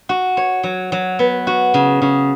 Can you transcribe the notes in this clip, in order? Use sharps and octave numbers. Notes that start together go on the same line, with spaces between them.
F#4
C#5
F#3
F#3
B3
F#4
C#3
C#3